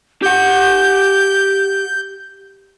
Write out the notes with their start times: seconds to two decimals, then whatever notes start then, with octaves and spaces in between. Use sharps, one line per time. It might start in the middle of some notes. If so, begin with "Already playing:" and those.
0.23 G4 F#5 G6